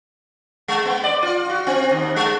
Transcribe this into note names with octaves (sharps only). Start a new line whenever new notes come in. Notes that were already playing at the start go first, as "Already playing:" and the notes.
G#3
B3
D5
F4
F#4
C4
D#2
G#3